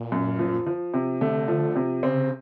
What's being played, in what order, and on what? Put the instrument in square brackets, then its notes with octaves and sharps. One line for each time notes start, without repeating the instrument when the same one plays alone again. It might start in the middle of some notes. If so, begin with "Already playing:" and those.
Already playing: [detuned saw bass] A#2
[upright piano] F#2
F3
F3
C3
[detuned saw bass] D3 [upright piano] A3
[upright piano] F3
C3
[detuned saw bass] C#3 [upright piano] C4